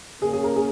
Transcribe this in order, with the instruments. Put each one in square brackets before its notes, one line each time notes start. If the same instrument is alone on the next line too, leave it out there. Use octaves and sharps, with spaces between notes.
[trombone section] C#3 A#3 C#4 [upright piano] G#4
[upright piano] G#4
A#4
G#4